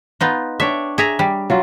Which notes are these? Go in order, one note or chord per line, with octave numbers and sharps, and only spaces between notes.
B3 D#4 F4
D4 C#5 E5 G5
G#4 E5 A#5
G3
F#3 F4